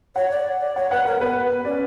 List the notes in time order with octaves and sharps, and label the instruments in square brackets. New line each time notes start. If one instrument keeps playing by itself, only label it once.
[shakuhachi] C#5 [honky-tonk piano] F#5
[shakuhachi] D5
D5
[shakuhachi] C#5 [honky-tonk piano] F#5
[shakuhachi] B4 [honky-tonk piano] F#5
[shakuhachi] A#4 [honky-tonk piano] F#5
[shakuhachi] B3 [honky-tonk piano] B4
[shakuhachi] B3
[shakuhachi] C#4 [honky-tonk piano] D5